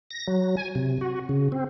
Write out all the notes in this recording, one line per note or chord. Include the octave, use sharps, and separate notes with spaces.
A#6
F#3
G#5
C3
F#4
C#3
C4